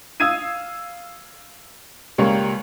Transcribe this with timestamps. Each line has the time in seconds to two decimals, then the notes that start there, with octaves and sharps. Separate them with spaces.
0.20 F5 D#6 E6 G#6 C7 D#7
2.18 C#2 G3 A#3 C#5